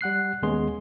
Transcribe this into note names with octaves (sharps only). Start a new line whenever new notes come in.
G3 F#5 F#6 C7
D#2 G#3 B3 C#4 G#4 C6